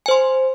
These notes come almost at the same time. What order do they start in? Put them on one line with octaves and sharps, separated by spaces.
G#5 C5 C6